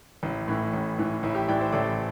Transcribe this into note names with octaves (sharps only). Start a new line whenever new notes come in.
A1 E4
A2 E3
A1
A2 E3
A1 E4
G4
A2 E3 D5 G5
C5 E5
A1 A4 D5